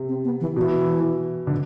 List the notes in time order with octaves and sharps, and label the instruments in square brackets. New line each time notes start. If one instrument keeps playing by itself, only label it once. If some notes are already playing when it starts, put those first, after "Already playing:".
Already playing: [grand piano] C3
[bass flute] C4
B3
E3
[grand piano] B2 [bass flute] E3
[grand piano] D3